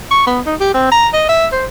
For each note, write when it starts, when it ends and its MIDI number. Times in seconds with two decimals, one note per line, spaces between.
0.11 0.25 85
0.27 0.41 59
0.46 0.55 63
0.60 0.73 67
0.74 0.87 60
0.91 1.08 82
1.13 1.25 75
1.29 1.47 76
1.52 1.66 72